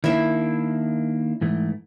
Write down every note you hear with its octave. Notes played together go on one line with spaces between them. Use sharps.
D#3 A#3 D4 E4 E5
G#2 E3 A3